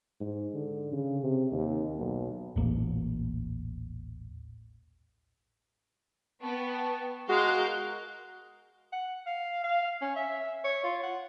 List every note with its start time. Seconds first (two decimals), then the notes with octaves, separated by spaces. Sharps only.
0.20 G#2
0.54 D3
0.92 C#3
1.23 C3
1.52 D#2
1.98 B1
2.56 D#1 A1 A#3
6.42 B3 G5 A5 C#6
7.29 G#3 F#4 A#4 F5 F#6 G6
8.92 F#5
9.27 F5
9.64 F5
10.02 C#4
10.16 E5
10.64 C#5
10.84 F4
11.03 F#5